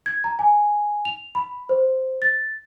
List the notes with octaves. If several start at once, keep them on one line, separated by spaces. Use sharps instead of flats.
G#6
A#5
G#5
F7
B5
C5
A6